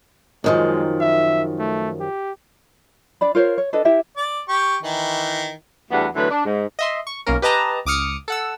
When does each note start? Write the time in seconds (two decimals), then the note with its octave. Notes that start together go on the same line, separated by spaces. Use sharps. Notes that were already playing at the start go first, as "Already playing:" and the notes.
0.44 F#2 D#3 F3 G#3
1.01 E5
1.59 A3
2.00 G4
3.21 D4 D5 B5
3.35 F4 A#4 C5 C#5
3.58 C#5
3.73 D4 A4 B4 D#5
3.85 E4 G4 E5 G5
4.17 D5
4.48 G4 C#6
4.83 D#3 E3
5.91 E2 G3 A3 B3 D4 F#4
6.15 D3 E3 F#3 A3 B3 B4
6.30 D4
6.45 G#2
6.79 D#5 E5 C6
7.07 C#6
7.26 B1 A#3 C#4 A#4
7.42 G4 B4 D#5 A5 A#5
7.86 C#2 D6 D#6 F6 C#7
8.28 A4 F#5 E6